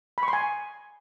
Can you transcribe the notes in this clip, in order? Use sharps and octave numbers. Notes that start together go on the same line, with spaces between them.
B5
C#6
C6
G#5